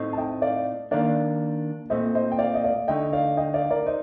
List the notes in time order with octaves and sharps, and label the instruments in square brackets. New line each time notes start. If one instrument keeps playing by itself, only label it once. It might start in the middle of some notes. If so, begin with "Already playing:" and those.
Already playing: [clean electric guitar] A2 A3 C4 D#4
[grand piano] A5
D#5 G5
D5 F5
[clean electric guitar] D#3 A#3 D4 [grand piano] D5 F5
[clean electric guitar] A#2 A3 C4 [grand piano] C5 D#5
[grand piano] C5 D#5
G5
D5 F5
D#5
D5 F5
[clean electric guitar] D3 A3 D#4 [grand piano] D#5 G5
[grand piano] D5 F5
D#5 G5
D5 F5
A#4 D5
[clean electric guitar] D#4 [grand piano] C5 D#5